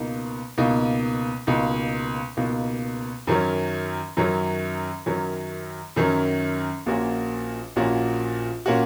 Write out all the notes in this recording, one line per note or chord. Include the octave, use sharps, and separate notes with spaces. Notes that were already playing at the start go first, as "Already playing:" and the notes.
Already playing: C#2 B2 A#3 D#4
C#2 B2 A#3 D#4
C#2 B2 A#3 D#4
C#2 B2 A#3 D#4
F#2 D#3 F#3 C#4
F#2 D#3 F#3 C#4
F#2 D#3 F#3 C#4
F#2 D#3 F#3 C#4
A#1 A#2 A#3 C#4 F#4
A#1 A#2 A#3 C#4 F#4
A#2 A#3 C#4 F#4